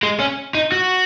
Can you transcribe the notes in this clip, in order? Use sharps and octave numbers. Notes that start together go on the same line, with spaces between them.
G#3
C#4
D#4
F#4